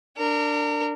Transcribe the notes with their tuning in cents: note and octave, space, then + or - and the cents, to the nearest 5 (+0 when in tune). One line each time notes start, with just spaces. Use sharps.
D4 +0 A#4 -30